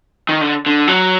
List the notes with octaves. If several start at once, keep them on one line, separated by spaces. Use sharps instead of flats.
D#3
D3
D3
F#3